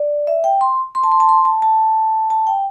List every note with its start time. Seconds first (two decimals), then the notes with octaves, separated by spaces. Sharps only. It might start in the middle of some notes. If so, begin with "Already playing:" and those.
Already playing: D5
0.27 E5
0.44 G5
0.61 C6
0.95 C6
1.04 A5
1.12 C6
1.20 A5
1.29 C6
1.45 A5
1.62 A5
2.30 A5
2.47 G5